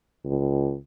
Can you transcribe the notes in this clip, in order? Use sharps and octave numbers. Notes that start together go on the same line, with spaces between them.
C#2